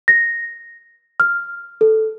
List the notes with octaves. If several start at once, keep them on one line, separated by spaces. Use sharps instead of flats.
A#6
F6
A4